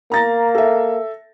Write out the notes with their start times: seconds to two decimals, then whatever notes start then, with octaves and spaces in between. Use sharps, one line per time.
0.12 A#3 A#5 A6 A#6
0.55 A4 E5